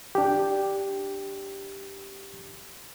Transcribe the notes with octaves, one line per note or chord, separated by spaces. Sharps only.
D4 G4